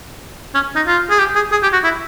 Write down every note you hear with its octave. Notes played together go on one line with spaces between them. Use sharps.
C#4
D#4
F4
G#4
G4
G#4
G#4
G4
F#4
E4